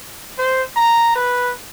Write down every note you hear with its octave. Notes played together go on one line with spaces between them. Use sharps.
C5
A#5
B4